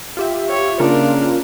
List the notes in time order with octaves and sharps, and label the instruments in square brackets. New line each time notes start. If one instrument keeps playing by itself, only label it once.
[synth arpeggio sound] F4 G4 E5
[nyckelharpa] C#5
[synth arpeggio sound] C#3 A#3 F4 [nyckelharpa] D4 A#4